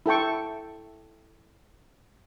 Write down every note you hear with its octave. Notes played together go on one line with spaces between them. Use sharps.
E4 A4 G5 C#6